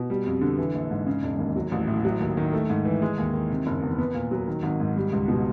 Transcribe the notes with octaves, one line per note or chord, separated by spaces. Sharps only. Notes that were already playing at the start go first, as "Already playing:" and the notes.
Already playing: B2
G3
F2
D3
E3
A#1
G#2
C#3
E1
D#2
F#3
A1
A2
F#3
D#2
D#3
A3
G#2
E3
G#3
D#2
D#3
C3
F#1
E2
B3
A#2
F#3
D#3
G#1
G#2
G3
C#2
B2